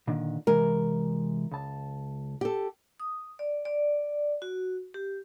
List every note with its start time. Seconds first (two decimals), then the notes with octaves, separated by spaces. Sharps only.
0.07 A#2 D3 D#3
0.47 C3 E3 G#3 A#4
1.51 C#2 A5
2.41 G4 A4
3.00 D#6
3.39 D5
3.65 D5
4.42 F#4
4.94 G4